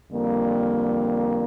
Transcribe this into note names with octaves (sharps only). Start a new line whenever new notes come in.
F2 D3 G3 A#3